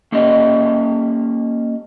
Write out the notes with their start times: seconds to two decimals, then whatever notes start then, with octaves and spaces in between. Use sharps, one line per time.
0.12 A#3 C#4 G4 D#5